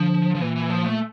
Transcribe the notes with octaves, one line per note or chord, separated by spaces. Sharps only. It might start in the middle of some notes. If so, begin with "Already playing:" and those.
Already playing: D3 F3
F3
A#2 E3
E3
F3
A3